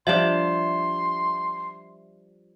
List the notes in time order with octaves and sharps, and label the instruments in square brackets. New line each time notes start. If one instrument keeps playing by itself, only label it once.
[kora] F3 G3 D4 [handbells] E5 [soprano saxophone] C6